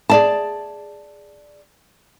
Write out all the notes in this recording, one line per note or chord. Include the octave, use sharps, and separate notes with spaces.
G#4 D5 A5